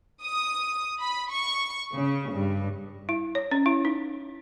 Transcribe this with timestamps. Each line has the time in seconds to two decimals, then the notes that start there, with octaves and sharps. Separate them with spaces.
0.23 D#6
1.01 B5
1.30 C#6
1.94 C#3
2.30 G2
3.09 E4
3.35 C#5
3.51 C#4
3.66 E4
3.85 D#4